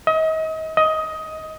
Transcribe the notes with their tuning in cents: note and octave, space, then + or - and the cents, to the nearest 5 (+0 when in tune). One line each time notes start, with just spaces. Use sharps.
D#5 +35
D#5 +15